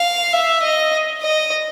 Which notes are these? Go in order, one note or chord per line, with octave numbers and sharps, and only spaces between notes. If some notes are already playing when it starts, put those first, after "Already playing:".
Already playing: F5
E5
D#5
D#5